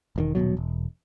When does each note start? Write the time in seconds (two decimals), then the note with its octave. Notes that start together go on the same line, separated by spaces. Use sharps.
0.16 E1 A#2 D#3
0.35 D#1 C2 B2 F#3
0.57 E1